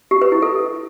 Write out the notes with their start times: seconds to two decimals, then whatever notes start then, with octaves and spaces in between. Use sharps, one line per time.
0.11 G4
0.22 B4
0.32 E4
0.42 A4